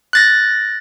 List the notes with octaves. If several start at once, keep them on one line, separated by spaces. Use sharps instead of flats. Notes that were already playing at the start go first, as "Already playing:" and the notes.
F#6 A6 A#6